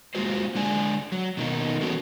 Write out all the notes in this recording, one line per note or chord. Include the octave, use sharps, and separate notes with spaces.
G#3 A#3 F4 F#4 C5
D3 G#3 D5 G#5
F#3
B2 D#3 A#3 D#4
E3 B3 C#4 F#4 A4 A#4